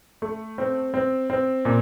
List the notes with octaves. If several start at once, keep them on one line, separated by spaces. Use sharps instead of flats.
A3
C4
C4
C4
A#2